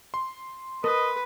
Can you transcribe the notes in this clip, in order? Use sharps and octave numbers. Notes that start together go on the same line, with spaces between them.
C6
A#4 B4 D#5